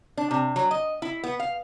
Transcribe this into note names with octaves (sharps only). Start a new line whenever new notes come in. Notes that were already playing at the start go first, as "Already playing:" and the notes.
D4
C3
F#3
D#5
E4
B3
F5